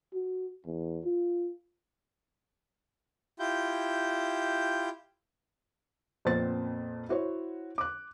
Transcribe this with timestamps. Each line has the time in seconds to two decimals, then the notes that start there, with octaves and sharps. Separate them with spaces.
0.14 F#4
0.66 E2
1.05 F4
3.40 E4 F4 G4 G6
6.25 F2 A#2 B3 C4 C5 A6
7.09 E4 F#4 C5 C#5
7.78 D6 F#6